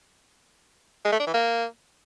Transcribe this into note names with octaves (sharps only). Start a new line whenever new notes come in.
G#3
A3
D4
E3
A#3